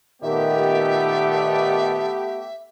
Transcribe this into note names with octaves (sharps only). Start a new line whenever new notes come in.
A#2 D#3 A3 B3 G4 E5